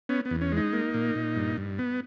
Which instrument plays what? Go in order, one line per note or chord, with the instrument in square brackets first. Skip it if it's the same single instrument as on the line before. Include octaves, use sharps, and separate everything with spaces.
[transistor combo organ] B3 C#4
B3
E2
C#4
G#3 D#4
A#3
A#2
A#2
G2
G2
B3